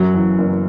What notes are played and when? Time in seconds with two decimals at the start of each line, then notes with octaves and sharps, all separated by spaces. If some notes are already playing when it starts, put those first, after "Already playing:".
Already playing: F#2 F#3
0.14 E3
0.38 F#1